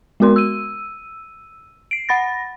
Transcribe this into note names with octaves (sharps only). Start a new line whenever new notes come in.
G#3 B3 F#4 A#4 C6
E6 D#7
C7 D7
F#5 B5 A6 A#6